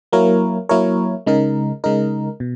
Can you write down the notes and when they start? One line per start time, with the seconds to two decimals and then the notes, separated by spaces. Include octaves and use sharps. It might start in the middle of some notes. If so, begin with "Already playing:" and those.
0.13 F#3 A#3 E4 A#4 C#5
0.69 F#3 A#3 E4 A#4 C#5
1.26 C#3 G#3 D#4 A#4
1.84 C#3 G#3 D#4 A#4
2.40 B2